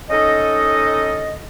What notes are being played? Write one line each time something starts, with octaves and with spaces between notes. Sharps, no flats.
C#4 D#4 A4 D#5